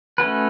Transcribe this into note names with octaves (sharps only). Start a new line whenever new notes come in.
A3 C#4 F#4 B4